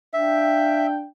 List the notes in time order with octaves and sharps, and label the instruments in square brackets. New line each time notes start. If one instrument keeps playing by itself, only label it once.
[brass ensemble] D4 F5 G5 [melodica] E5